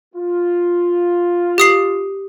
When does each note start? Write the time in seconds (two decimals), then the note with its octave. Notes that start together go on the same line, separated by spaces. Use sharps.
0.15 F4
1.58 G4 D#6 C7